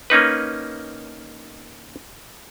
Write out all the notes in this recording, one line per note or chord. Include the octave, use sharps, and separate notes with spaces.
A#3 C#4 D#4 B4